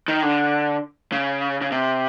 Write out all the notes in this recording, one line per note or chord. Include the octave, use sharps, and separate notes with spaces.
D#3
D3
C#3
C#3
C3